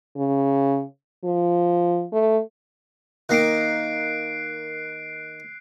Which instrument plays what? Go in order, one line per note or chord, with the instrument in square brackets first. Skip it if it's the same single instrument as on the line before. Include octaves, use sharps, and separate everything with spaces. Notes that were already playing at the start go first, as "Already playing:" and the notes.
[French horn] C#3
F3
A3
[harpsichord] D#3 A#3 [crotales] F#6 C7 D7